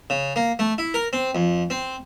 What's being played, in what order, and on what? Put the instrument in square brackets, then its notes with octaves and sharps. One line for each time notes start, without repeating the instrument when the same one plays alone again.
[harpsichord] C#3
A#3
A3
E4
A#4
C4
F2
C4